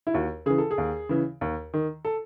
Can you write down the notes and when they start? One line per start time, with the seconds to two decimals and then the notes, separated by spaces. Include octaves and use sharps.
0.07 E4
0.14 D#2 F#4
0.46 C#3 E3 G#4
0.58 A4
0.71 G#4
0.78 D#2
1.09 C#3 E3
1.41 D#2
1.74 D#3
2.05 A4